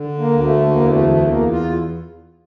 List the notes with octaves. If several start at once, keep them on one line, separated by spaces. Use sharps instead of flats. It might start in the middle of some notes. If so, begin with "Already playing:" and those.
Already playing: D3
A#3
D2
A#3
A3
E2 A#3
A3
E2 A3
A#3
F4